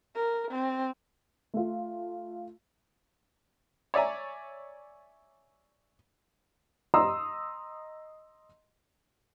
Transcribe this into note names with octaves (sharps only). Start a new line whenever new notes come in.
A#4
C4
A3 F4
C#5 D5 E5 G#5 A#5
D#5 A#5 C6 D#6 E6